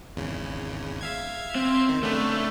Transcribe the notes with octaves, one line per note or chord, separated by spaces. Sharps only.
G#1 E2 C#3
E5 F5 G#6
C4
D#3
C#3 A3 B3 D4